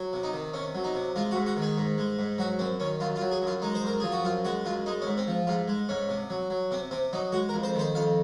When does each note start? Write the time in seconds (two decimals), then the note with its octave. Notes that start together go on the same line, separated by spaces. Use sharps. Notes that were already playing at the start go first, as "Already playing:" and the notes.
Already playing: F#3
0.13 C3
0.23 D#4
0.33 D#3
0.54 C3 C#4
0.75 F#3
0.84 D#4
0.95 C3
1.16 G#3 F4
1.31 F#4
1.35 G#2
1.46 F#4
1.56 D#3
1.62 G#4
1.77 G#2
1.98 G#3
2.19 G#2
2.38 F#3 F#4
2.59 F#2 C4
2.80 D#3 C#4
3.00 F#2 F4
3.16 F4
3.22 F#3
3.31 G#4
3.42 F#2 F4
3.62 G#3 D#4
3.75 C5
3.83 F#2 A#4
4.00 F3 G#4
4.12 F#4
4.24 F#2 F4
4.45 G#3 F#4
4.65 F#2 F4
4.86 G#3 D#4
5.02 C#4
5.07 G#2
5.17 C4
5.27 F3
5.47 G#2 F4
5.68 G#3
5.89 G#2 C#4
6.09 C3
6.30 F#3
6.50 F#3
6.71 C3 C4
6.91 C3 C4
7.13 F#3 D#4
7.32 G#3 F#4
7.49 A#4
7.54 F2
7.63 C5
7.74 D#3
7.79 C5
7.95 F2 F5